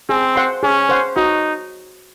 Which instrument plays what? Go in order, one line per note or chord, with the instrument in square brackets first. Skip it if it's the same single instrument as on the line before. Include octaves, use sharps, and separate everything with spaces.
[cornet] C4 [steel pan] G#4
[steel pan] C5 F#5 C6
[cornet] C#4 [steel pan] G#4
[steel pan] C5 F#5 C6
[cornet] D#4 [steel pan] F#4